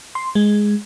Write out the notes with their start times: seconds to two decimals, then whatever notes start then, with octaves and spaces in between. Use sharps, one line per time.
0.15 C6
0.35 G#3